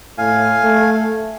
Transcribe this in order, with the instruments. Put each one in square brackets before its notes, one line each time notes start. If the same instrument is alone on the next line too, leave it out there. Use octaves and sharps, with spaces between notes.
[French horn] A2 [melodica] F5 G#5
[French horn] A3